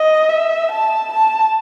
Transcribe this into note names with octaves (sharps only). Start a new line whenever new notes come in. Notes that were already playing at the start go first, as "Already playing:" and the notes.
Already playing: D#5
E5
A5
A5